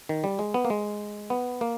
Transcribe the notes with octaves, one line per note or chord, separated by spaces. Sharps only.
D#3
G3
G#3
B3
A#3
G#3
B3
A#3